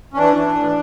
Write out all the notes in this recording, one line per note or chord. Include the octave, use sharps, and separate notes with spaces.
C#4
E3 D4
E3
A2